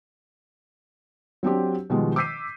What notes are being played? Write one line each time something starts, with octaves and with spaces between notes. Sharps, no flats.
F#3 C4 D4 G4
B2 D#3 F3 G3 G#3
D6 E6 G6 B6 C7 D#7